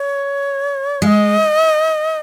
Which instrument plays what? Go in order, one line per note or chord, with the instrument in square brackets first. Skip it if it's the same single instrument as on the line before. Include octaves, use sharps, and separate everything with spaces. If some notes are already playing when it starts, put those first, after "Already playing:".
Already playing: [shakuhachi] C#5
[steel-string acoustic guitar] G#3 [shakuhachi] F#5
[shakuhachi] D#5